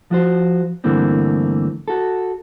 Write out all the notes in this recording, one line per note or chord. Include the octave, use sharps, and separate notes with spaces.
F3 F#4 C5
G2 D3 E3 A3 A#3 C4
F#4 A4